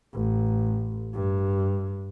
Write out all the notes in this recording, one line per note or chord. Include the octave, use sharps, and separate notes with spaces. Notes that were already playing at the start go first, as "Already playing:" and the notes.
A1
G2